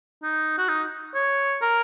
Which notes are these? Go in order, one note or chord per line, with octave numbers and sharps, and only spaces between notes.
D#4
F#4
D#4
C#5
A#4